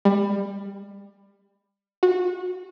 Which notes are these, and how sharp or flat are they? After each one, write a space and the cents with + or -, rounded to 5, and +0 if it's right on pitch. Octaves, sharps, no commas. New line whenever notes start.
G3 +25
F#4 -25